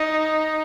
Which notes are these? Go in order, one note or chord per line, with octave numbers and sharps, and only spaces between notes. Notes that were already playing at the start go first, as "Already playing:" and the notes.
Already playing: D#4